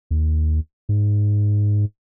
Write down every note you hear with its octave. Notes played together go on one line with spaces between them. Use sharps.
D#2
G#2